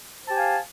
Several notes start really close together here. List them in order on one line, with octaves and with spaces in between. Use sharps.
C5 A5 G4 G#5 F5